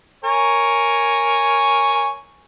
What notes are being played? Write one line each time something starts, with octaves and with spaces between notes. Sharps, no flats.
A#4 C#5 G#5